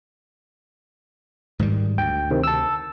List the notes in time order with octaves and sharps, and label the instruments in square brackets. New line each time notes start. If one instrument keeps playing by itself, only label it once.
[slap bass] G#2 D#3 G3
[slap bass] D2 [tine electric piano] G5
[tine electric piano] C3 D#3 C4
A5 E6